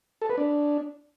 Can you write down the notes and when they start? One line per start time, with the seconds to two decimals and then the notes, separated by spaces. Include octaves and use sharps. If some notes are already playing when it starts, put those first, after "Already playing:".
0.22 A4
0.30 B4
0.38 D4